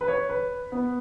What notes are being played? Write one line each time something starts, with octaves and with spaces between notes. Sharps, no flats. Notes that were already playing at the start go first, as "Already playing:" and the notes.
B4
C#5
B4
B3